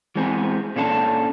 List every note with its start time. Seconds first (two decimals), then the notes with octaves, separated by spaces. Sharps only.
0.15 E3 G#3 B3 C4 G#4
0.76 A#2 C#4 D4 A4 C#5 A5